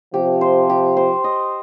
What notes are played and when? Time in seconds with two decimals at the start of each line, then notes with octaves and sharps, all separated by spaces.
0.13 C3 F3 G4
0.41 C5
0.70 G4
0.97 C5
1.24 D#5